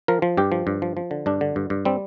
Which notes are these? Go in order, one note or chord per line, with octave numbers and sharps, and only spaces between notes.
F3 A#4
F3
G2 G4
F3
G2
F3
F3
D3
G2 D4
D3
G2
G2
G3 C4